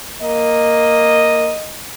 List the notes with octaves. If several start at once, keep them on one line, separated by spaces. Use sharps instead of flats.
A#3 D#5